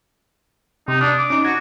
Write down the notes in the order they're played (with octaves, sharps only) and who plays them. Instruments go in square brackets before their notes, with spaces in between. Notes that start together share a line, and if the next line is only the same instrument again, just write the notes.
[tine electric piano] C3 [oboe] D#4
[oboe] D4 [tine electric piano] D#6
[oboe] D6
[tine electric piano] C#4 D#4
[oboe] F#4 [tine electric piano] G#6